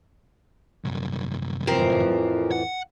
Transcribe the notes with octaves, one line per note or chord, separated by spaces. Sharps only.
C2 F#2
F2 A2 E3 F3 C4 A#4
F#5